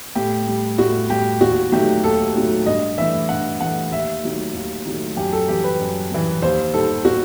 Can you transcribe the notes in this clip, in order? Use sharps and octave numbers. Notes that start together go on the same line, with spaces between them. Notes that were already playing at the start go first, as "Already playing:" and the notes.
A2 G4
G3
A2 F#4
G3 G4
D#2 F#4
D#3 F#3 A3 G4
D#2 A4
D#3 F#3 A3
G2 D#5
E3 A3 E5
G2 F#5
E3 A3 F#5
D#2 E5
D#3 F#3 A3
D#2
D#3 F#3 A3
F#2 G4
A4
E3 G3 G4
B4
F#2
E3 G3
D#2 C5
D#3 G3 A4
F#4